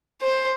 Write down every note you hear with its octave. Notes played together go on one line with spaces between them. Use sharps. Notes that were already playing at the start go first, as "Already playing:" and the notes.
C5